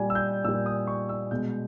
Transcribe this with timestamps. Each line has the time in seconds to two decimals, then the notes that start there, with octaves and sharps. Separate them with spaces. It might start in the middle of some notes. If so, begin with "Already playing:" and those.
Already playing: A#2 G3 G#5
0.10 E6
0.15 G6
0.44 A#2 E6
0.48 G3
0.66 D#6
0.87 C#6
1.09 E6
1.31 B2 G#3 G6